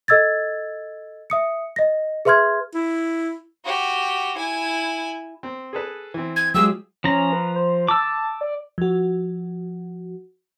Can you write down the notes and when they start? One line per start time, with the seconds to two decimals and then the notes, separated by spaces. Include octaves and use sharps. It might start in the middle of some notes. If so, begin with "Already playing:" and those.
0.08 A4 D#5 E6 G#6 A6
1.30 E5 D#6 C#7
1.76 D#5 A#6
2.25 G#4 B4 E5 C6 F6 G#6
2.74 E4
3.65 F#4 G4
4.37 E4 G#5
5.43 C4
5.73 G#4 A4 B4
6.14 E3 C4
6.36 G#6
6.54 F#3 G#3 F4 G4 G#4 E6
7.04 F3 C#4 A#5
7.33 B4
7.56 C5
7.88 A5 D6 E6
8.41 D5
8.78 F3 F#4